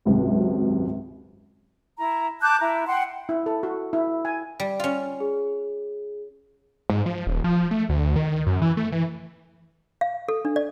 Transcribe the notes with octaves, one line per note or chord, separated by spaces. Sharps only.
G#1 C#2 F#2 C3 C4
E4 A#5
A5 D6 F#6 G6
E4 A#5
F#5 G5 C6
E4
A4
F#4
E4
G#5
G3
C#4 F4
G#4
G#2
F3
D#1
F3
A3
D2
D#3
F#2
E3
A3
E3
F5
A4
D4
D5